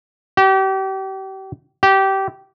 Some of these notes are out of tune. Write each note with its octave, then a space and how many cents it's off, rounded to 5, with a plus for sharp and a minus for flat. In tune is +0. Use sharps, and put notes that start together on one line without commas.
G4 -35
G4 -20